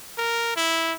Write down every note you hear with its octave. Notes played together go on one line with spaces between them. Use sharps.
A#4
E4